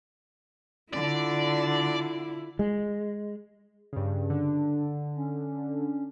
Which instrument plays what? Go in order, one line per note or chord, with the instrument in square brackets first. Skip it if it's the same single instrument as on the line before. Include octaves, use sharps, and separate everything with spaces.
[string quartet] D3 [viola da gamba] E4 F4 [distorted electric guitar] D5
[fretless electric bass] G#3
[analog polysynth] G2 C#3
[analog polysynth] D3 [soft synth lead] D4
[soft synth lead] C#4